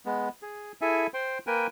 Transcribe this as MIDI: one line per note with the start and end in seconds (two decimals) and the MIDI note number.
0.06 0.29 56
0.06 0.29 59
0.42 0.72 68
0.81 1.07 64
0.81 1.07 68
0.81 1.07 69
0.81 1.07 76
0.81 1.07 80
1.14 1.38 72
1.14 1.38 79
1.14 1.38 84
1.47 1.67 58
1.47 1.67 70
1.47 1.67 71
1.47 1.67 79
1.47 1.67 80